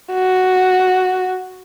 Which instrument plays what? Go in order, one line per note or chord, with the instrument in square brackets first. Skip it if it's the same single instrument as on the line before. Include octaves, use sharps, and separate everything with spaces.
[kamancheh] F#4